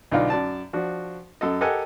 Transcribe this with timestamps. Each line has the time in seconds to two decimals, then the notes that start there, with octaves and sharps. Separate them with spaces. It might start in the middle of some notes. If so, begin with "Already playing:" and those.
0.12 B1 D3 D#4 F4 D5
0.30 F#2 D5 A5
0.73 F3 D4 F#4
1.41 F#2 A4 D#5
1.61 G4 A4 A#4 D#5 F#5 G#5